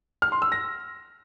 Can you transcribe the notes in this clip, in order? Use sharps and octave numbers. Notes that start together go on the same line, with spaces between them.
F6
C6
E6
A#6